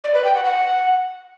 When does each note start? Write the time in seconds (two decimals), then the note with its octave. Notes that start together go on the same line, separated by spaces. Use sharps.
0.04 D5
0.14 B4
0.24 G5
0.35 F#5
0.45 F#5